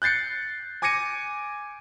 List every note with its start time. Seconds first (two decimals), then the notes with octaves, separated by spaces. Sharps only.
0.02 F#6 G6 A6 C7 C#7
0.82 G#5 D6 G#6 A#6 C#7 D#7